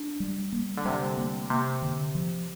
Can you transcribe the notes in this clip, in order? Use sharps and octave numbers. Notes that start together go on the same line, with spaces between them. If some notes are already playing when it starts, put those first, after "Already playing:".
Already playing: D4
G3
A#3
D3
C3 G3
A#3
C3 A#3
D3
F3